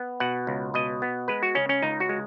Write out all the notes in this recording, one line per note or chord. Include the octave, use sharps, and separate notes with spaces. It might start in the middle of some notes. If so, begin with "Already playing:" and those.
Already playing: B3
B2 F#5
C#2
B2 D#5
B3
G#3 B4
F#4
C#3 C#4
C#4
C#2 D#4
F#4
G#3